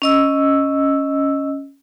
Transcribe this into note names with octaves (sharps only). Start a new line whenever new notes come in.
C#4 D#5 E6